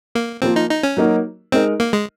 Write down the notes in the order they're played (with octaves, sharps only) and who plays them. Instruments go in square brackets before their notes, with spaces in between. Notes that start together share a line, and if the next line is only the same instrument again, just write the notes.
[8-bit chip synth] A#3
[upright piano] F3 A#3 F4 [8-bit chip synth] C4
[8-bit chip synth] D#4
D#4
C#4
[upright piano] F#3 A#3 D#4 F#4 A#4
[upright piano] G#3 D#4 A#4 D#5 [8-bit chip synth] C4
[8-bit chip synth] A#3
G#3